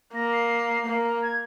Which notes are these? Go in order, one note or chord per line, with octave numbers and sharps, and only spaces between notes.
A#3 A#6
C7
A#3
G#6